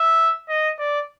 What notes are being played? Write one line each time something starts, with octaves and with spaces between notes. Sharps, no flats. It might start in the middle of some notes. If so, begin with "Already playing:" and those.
Already playing: E5
D#5
D5